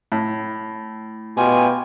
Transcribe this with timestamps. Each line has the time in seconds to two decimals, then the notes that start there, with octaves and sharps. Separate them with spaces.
0.12 A2
1.37 B2 F4 G4 G#5